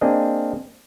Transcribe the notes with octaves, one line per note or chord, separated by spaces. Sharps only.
A#3 C4 D4 G#4 D#5